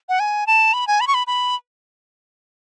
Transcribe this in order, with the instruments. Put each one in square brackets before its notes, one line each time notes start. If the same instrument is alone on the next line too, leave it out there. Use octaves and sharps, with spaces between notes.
[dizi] F#5
G#5
A5
B5
G#5
B5
C#6
B5
B5